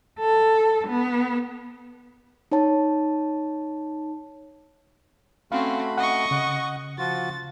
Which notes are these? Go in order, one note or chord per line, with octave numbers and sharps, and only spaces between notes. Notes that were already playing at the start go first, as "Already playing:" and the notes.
A4
B3
D#4 C#5 A5
A3 C4 C#4 F#4 F5 B5
D#5 F#5 C#6
C#3 F#5
F3 F4 F#4 A6